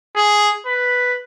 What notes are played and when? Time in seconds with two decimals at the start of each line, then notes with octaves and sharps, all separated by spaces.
0.16 G#4
0.66 B4